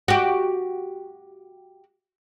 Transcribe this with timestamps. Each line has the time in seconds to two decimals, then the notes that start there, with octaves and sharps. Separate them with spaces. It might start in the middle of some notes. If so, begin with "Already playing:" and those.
0.08 F#4 G4